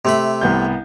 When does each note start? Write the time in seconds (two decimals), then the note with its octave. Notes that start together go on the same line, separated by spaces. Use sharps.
0.05 C3 A3 B5
0.41 C2 B3 G6